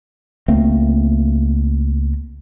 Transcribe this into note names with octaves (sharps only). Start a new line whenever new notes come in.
C#2 A3 A#3 C4